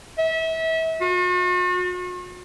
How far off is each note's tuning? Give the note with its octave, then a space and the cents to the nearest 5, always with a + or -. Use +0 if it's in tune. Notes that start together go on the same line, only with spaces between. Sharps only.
E5 -30
F#4 -45